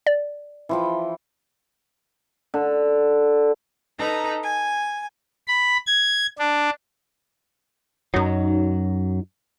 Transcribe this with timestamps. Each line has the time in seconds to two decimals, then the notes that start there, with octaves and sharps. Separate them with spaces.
0.07 D5
0.69 E3 F3 G5
2.54 D3
3.98 D#4 A4 B4 A#5
4.44 G#5
5.48 B5
5.87 G#6
6.38 D4
8.14 F#2 F#3 D#4